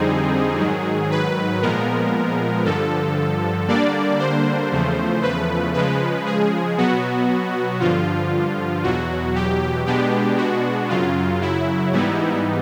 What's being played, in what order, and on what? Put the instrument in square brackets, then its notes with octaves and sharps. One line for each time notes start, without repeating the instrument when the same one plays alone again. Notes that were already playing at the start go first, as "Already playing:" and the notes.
Already playing: [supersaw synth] F2 D3 G3 C4 D#4 G#4
G#2 D#3 F#3
B4
A#2 F3 G#3 B3 A#4
G2 D3 F3 A4
D3 G3 A#3 D4 D5
C5
E2 C#3 F3 A3
B4
C#3 F3 G#3 B4
G#4
B2 F#3 B3 F#4
G2 D3 F3 F4
E2 B2 F#3 F#4
G4
B2 G#3 B3 D4 G4
F#4
F#2 C#3 F#3 F4
E4
G#2 E3 G3 B3 D#4 E4